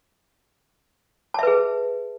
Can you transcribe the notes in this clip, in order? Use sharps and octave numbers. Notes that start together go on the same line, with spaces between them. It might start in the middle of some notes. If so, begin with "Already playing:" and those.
G#4 B4 E5 A5